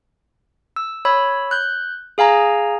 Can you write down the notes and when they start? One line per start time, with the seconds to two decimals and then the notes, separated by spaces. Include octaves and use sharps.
0.76 E6
1.05 C#5 B5 E6
1.51 F#6 G6
2.18 G#4 F5 G#5 A#5